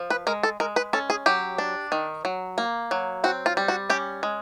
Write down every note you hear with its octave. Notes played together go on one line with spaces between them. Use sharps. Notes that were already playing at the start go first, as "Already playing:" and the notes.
Already playing: F3
B4
G#3 A#4
A4
G#3 A#4
B4
C#4 A4
G#4
F#3 G4
D4
D#3
F#3
A#3
F#3
C4 F#4
F4
G3
F#4
C#4 G4
G#3